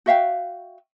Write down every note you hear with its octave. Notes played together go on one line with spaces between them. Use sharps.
F#4 E5 F5 G5